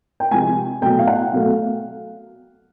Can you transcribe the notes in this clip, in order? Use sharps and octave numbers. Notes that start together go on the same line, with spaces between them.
G5
C3 F3 G#3 G#5
B2 F#3 A3 G5
F5
F#5
B2 F#3 A3 F5